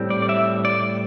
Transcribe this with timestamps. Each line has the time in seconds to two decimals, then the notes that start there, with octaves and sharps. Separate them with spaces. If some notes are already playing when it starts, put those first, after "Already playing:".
Already playing: A2 G3 C4
0.10 D5
0.22 D5
0.29 E5
0.65 D5